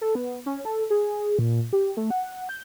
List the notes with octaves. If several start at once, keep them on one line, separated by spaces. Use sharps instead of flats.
A4
B3
C#4
A4
G#4
A#2
G4
A3
F#5
G6